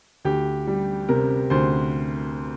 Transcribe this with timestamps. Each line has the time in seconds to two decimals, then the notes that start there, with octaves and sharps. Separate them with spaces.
0.25 D2 G4
0.67 G3
1.09 C3 A#4
1.50 D2 C5